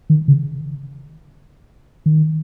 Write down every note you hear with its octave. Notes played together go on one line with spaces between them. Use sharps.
D#3
C#3
D#3